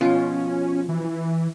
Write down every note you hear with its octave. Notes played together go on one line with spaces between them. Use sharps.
B2 F3 C#4 F4
E3